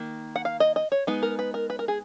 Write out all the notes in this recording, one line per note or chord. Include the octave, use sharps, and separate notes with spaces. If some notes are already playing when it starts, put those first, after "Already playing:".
Already playing: D#3 A#3
F#5
F5
D#5
D#5
C#5
G#3 B3 D#4
A#4
B4
A#4
B4
A#4
G#4